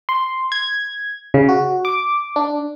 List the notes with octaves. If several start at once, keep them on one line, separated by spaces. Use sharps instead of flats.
C6
G#6
C#3
F#4
D6
D4